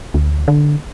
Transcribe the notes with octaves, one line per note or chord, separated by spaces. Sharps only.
D2
D3